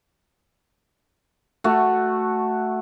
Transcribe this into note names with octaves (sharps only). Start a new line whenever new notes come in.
A3 F#4